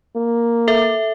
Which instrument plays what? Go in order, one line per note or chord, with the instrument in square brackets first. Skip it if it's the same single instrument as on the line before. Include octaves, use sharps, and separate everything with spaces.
[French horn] A#3
[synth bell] A4 E5